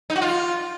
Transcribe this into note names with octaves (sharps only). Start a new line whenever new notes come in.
D#4
F#4
F4